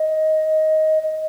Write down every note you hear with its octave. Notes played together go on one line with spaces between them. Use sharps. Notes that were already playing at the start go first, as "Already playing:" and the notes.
Already playing: D#5
D#5